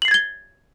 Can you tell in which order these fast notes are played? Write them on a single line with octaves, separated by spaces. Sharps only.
F#7 C7 A6 G#6 G7